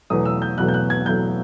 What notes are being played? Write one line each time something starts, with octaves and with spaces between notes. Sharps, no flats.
E2 B2 F#3 A3 D#6
E6
G6
E2 B2 F#3 A3 F#6
G6
F#6
G#6
E2 B2 F#3 A3 G6